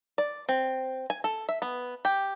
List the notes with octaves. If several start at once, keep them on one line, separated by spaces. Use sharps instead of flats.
D5
C4
G#5
A4
E5
B3
G4